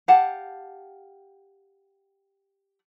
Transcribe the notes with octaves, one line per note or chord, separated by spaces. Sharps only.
G4 F5 F#5 A5